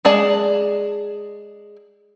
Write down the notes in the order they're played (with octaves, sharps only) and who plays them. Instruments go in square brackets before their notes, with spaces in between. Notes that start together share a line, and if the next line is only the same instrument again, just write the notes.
[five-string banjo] G#3 G#4 D5 A5